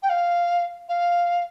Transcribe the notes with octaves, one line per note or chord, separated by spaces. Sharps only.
G5
F5
F5